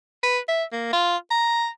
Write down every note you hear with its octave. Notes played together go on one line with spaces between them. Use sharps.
B4
E5
A#3
F4
A#5